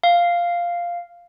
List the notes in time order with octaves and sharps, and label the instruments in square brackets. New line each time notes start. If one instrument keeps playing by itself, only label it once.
[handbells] F5